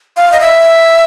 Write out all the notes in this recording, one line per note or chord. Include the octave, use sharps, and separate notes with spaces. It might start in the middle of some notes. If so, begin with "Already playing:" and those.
F5
D#5
E5